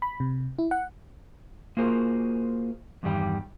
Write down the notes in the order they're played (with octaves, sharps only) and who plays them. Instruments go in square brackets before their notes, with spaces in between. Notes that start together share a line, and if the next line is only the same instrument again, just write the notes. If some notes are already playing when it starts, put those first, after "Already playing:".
[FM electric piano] B5
C3
E4
F#5
[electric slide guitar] A#3 F4 F#4 G#4 A#4 C5
E2 G2 D#3 G3 G4 G5